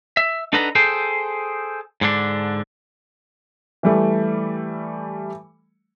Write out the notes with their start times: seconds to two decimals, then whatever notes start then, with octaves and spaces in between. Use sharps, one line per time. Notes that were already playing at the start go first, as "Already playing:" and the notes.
0.17 E5
0.53 D4 D#4 A4 B4 F#5 A#5
0.75 G#4 A4 C5 G5
2.01 G#2 D3 D4
3.83 E3 G3 A3